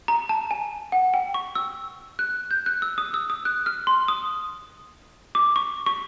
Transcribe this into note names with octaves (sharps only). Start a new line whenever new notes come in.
A#5
A5
G#5
F#5
G5
C#6
E6
F#6
G6
F#6
E6
D#6
E6
D#6
F#6
F6
C6
D#6
D6
C#6
C#6